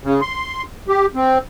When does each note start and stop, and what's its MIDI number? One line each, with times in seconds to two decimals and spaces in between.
0.04 0.21 49
0.21 0.63 84
0.88 1.06 67
1.15 1.38 60